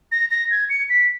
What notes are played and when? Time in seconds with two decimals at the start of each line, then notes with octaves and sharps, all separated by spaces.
0.12 A#6
0.31 A#6
0.51 G#6
0.70 C#7
0.89 B6